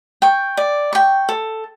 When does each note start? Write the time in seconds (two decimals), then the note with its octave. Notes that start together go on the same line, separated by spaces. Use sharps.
0.22 G5 C#6
0.57 D5
0.93 G5 C#6
1.29 A4